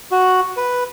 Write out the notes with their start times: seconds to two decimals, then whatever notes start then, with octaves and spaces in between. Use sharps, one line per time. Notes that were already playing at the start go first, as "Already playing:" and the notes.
0.11 F#4
0.57 B4